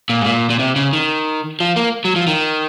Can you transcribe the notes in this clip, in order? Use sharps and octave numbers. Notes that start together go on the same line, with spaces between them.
A#2
G#2
A#2
A#2
C3
C#3
D#3
F3
A#3
F#3
F3
D#3